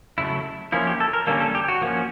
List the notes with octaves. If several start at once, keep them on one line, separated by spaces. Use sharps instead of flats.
C#3 F#3 A3 E4
F3 A#3 C#4 E4
G4
A4
A#4
D3 G3 A#3 C#4 A4
A4
G4
F#4
F3 A#3 C#4